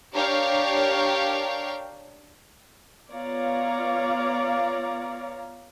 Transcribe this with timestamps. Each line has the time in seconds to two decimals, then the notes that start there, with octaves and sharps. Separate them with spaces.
0.14 D4 G4 A#4 C#5 F5 G5
3.12 B3 F4 C#5 D5 F5 A#5